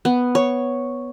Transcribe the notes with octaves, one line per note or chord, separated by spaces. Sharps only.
B3
C#5